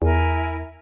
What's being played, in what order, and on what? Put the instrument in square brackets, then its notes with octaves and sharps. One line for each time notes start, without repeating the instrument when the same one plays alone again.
[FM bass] E2 [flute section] E4 A#4 G#5